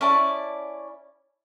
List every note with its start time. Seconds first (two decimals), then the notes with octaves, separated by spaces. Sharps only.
0.01 C#4 E4 D5 A5